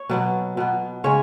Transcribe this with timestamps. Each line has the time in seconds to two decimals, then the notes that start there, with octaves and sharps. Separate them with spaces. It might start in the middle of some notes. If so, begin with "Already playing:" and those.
Already playing: C#5
0.10 B2 F#3 B3
0.57 B2 F#3 B3
1.04 C#3 G#3 C#5